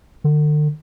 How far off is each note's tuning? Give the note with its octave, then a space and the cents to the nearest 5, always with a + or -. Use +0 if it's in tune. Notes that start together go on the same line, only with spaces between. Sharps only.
D3 +40